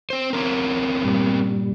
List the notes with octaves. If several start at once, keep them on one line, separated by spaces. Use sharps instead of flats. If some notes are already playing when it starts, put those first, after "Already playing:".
C4 C5
C4 C#4 A#4
G2 A#2 G3